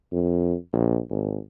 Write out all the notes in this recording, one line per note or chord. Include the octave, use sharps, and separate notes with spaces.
F2
A#1
G#1